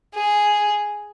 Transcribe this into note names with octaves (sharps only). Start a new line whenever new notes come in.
G#4